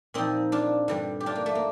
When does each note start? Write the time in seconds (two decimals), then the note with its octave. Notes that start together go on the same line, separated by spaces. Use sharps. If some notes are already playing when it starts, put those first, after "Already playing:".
0.14 A#2 F3 C4 D#4
0.52 D4 F4
0.88 G2 D3 G3
1.20 G4
1.26 D4 F4
1.35 A#3
1.46 A3
1.55 A#3